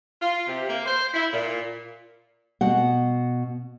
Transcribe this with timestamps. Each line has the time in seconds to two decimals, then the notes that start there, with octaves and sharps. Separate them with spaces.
0.22 F4
0.47 C3
0.69 A#3
0.85 C5
1.14 E4
1.33 A#2
2.61 B2 F#5